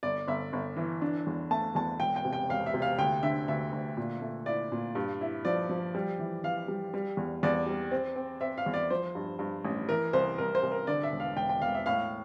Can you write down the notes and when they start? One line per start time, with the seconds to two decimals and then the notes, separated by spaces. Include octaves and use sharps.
0.03 G1 D5
0.27 G1 E5
0.53 G1
0.77 E3
1.02 D4
1.27 E2
1.51 A3 A5
1.75 E2 A5
2.00 E1 G5
2.16 G5
2.25 C3
2.33 G5
2.49 E1 F5
2.66 E5
2.74 C3
2.82 F5
2.98 D2 G5
3.23 D3 E5
3.48 D2 E5
3.73 D2
3.97 A#2
4.22 A3
4.46 E4 D5
4.72 A#2
4.95 G2
5.21 E4
5.45 F3 D5
5.69 F3
5.95 G3
6.19 E3
6.44 E3 F5
6.68 G3
6.94 G3
7.17 E2
7.43 E2 D5
7.67 G3
7.91 C4
8.16 C4
8.41 C4 E5
8.58 F5
8.66 E2
8.74 D5
8.90 F3 C5
9.15 G2
9.39 G2
9.65 A1
9.89 E3 A#4
10.13 C2 C5
10.38 C2 A#4
10.55 C5
10.63 C2
10.72 A#4
10.87 D3 D5
11.03 E5
11.12 E1
11.20 F5
11.36 E1 G5
11.49 G5
11.61 E1 F5
11.74 E5
11.86 A2 F5